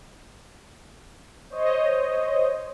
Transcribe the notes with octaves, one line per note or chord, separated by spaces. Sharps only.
C5 C#5 D#5